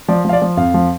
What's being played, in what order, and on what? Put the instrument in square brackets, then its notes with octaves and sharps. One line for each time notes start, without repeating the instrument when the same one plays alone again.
[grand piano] F3 D5
F3 F5
D5
F3
F2 F5
F3